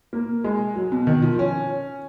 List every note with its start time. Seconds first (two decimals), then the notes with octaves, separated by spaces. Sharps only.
0.13 A#3
0.44 G#3
0.75 F#3
0.92 B2
1.07 D#3
1.22 F3
1.39 C#4